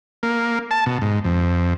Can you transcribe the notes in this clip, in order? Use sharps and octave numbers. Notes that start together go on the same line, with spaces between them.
A#3
A5
B2
G#2
F2